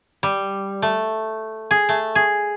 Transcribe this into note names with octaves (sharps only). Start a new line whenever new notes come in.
G3
A3
G#4
A3
G#4